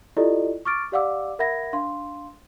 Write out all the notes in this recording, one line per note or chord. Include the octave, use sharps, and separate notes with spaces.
E4 F4 G4 A4 D5 D#5
C#6 D6 F6 A6 D7
G4 D5 F5 F#5 D6 E6
A#4 E5 F#5 B5 G#6 A#6
D4 F5 C6